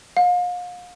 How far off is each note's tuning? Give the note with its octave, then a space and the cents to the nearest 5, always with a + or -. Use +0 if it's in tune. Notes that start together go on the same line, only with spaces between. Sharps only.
F5 +35